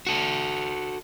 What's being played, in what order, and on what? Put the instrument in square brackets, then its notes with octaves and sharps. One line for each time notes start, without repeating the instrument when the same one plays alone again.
[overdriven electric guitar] F#4 A4